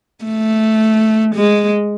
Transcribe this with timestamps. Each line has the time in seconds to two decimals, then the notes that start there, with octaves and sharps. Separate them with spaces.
0.25 A3
1.35 G#3